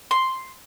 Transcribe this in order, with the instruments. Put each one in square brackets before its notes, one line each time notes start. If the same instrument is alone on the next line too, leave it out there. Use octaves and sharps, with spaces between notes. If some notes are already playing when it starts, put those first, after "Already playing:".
[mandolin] C6